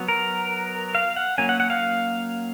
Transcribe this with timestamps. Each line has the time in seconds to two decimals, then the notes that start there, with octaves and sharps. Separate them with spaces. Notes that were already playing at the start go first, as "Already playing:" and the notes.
Already playing: F#3 B3
0.08 A#4
0.95 F5
1.16 F#5
1.38 F#3 A#3 C#4 G#5
1.49 F#5
1.60 F#5
1.70 F5